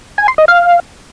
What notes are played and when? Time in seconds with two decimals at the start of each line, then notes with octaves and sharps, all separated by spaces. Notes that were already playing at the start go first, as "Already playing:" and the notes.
0.18 G#5
0.28 C6
0.38 D#5
0.48 F5